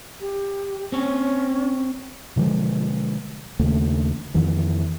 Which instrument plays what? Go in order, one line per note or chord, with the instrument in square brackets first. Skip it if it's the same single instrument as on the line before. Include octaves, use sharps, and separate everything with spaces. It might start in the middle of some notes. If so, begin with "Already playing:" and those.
[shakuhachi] G4
[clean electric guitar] C4 C#5 [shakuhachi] C#4
[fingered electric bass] B2 D3 F3 G#3
D#2 C#3 A3 A#3
F2 D#3 E3